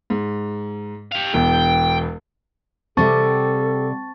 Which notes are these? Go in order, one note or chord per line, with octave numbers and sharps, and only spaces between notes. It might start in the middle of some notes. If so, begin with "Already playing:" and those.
G#2
G4 F5
E1 E2 G5
C3 G3 C4 A4 F#5 A5 C#6 A6